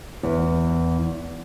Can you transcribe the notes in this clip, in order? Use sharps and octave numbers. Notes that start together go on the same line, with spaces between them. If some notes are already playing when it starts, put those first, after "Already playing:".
E2